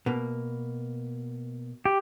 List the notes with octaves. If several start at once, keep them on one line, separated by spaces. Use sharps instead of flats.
B2 A#3
G4